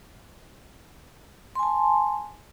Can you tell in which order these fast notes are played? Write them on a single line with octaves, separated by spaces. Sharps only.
C6 G#5 A5